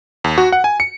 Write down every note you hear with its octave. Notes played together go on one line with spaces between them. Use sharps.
D#2
F#4
F#5
G#5
C#7